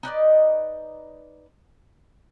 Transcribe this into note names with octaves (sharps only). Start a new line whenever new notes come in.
D#4 B4 D5 D#5